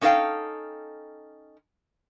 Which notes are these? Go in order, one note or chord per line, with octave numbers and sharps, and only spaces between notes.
C#4 D#4 A4 A#4 F5 G5